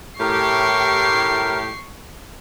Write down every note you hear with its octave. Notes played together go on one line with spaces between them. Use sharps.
A2 G4 A#4 C#6 C7